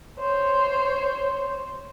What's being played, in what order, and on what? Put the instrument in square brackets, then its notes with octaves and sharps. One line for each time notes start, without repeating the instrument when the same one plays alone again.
[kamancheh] C5 C#5